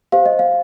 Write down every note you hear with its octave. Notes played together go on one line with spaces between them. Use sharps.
G4 C5 F5
D#5
F5